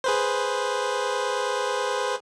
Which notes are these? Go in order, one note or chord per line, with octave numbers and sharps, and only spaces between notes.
G#4 B4 C5